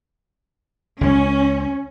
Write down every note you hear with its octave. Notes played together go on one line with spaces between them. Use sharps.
C#2 G#3 C#4